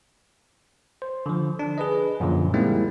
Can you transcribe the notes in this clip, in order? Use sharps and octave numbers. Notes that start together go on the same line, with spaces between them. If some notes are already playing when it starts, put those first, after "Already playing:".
C5
D3 F3
D4
G#4 B4 D#5
F#2 A#2 D3 F3
G3 G#3 A#3 C4 D#4 E4